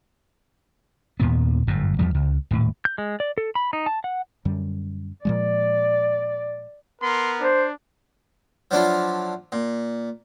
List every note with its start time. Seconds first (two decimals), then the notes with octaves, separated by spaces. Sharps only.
1.20 D#2 A#2 B3
1.67 G1 F#2 A2
1.99 E2 F3 G3
2.15 C#2
2.51 D#1 A2
2.85 G6
2.98 G#3
3.20 D5
3.38 A4
3.55 B5
3.73 D#4
3.86 A5
4.04 F#5
4.45 F#2 D3 G3
5.25 A#2 F3 G#3 D5
7.02 B3 A#4 C6
7.40 D4 C5
8.71 F3 F#3 D4 E4 F4
9.52 A#2